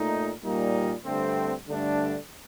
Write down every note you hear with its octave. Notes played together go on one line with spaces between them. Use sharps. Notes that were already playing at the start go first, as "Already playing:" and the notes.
Already playing: A#2 A3 D#4
A#2 G3 A#3 D#4
G2 D3 A3 C4
G2 D3 A3 D4